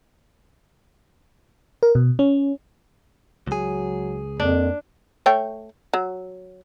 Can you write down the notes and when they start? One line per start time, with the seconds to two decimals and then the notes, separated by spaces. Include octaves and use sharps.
1.83 A#4
1.95 B2
2.19 C#4
3.47 C#2 F#3 G#4
4.40 F2 A#3 D4
5.26 A3 C#5 G5
5.94 F#3